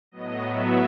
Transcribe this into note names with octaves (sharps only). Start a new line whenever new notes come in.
A2 F#3 B3 D#5
E5